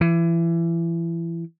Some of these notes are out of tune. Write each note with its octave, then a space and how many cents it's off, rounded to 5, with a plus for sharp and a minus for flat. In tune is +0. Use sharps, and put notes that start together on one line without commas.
E3 +25